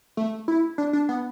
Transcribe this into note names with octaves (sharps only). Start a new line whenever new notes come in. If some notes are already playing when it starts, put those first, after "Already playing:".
A3
E4
D4
D4
B3